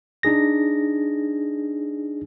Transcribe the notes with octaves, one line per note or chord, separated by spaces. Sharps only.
D4 D#4 G#4 A#6